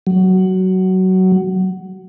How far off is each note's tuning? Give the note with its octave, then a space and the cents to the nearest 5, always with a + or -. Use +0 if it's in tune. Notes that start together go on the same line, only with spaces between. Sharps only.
F#3 +15